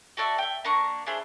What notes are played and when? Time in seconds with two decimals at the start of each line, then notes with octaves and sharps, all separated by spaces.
0.17 F#4 A4 D5 E5
0.38 E5 G5
0.64 A#3 D4 A#5 C#6
1.06 D4 E4 G#4 C5